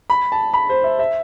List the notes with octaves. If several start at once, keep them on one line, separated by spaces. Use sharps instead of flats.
B5
A5
B5
C5
E5
E5